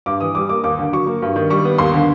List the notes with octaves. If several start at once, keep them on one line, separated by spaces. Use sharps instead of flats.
G2 D6
E3 D#6
G3 D6
A#3 D6
D#2 D6
D3
F#3 C#6
A#3
G2
D#3
G3 C#6
B3
D#2 C6
D3